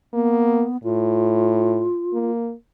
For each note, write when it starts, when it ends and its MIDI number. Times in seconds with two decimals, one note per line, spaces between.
0.13 0.65 58
0.13 0.77 59
0.84 1.86 45
0.84 2.30 65
2.13 2.53 58